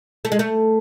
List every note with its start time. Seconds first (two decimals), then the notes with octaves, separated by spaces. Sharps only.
0.25 A3
0.32 G#3
0.39 A3